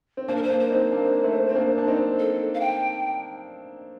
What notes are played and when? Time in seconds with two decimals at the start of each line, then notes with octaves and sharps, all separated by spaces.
0.17 C4
0.28 A#3 D4 C5
0.36 A#4
0.43 C5
0.50 A#3 D4
0.60 C5
0.71 C4 D#4
0.92 A#3 D4
1.23 A3 C4
1.49 C4
1.55 A#3 D4
1.78 D4
1.87 C4 D#4
2.19 A4
2.55 F5
2.60 G5